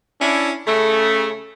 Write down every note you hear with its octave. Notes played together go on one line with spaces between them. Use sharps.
C#4 D4 E4
C#3 A3